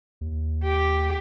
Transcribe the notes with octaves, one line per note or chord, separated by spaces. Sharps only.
D#2
G4